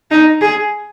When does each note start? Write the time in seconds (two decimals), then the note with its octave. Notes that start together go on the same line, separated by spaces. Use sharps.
0.11 D#4
0.41 G#4